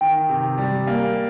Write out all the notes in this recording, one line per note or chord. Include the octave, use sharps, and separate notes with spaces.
D#3 G5
C3
G3
A#3